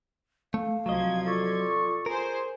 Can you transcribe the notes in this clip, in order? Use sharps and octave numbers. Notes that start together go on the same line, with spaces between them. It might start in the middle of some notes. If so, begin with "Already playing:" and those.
A3 F5
C2 F3 F#3 D#5 G#6
F4 A4 D5 C#6
G#4 A#4 C5